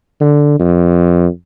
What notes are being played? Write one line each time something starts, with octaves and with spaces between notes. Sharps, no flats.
D3
F2